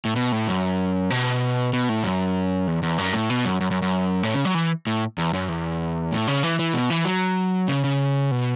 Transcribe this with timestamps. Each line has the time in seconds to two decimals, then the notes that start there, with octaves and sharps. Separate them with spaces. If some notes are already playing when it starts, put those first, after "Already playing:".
0.05 A2
0.16 B2
0.32 A2
0.47 F#2
1.10 B2
1.73 B2
1.89 A2
2.04 F#2
2.67 E2
2.83 E2
2.98 F#2
3.13 A2
3.30 B2
3.45 F#2
3.61 F#2
3.71 F#2
3.82 F#2
4.23 A2
4.34 C#3
4.45 F#3
4.54 E3
4.87 A2
5.18 E2
5.33 F#2
5.49 E2
6.12 A2
6.28 C#3
6.43 E3
6.59 E3
6.74 B2
6.90 E3
7.05 F#3
7.68 C#3
7.84 C#3
8.31 B2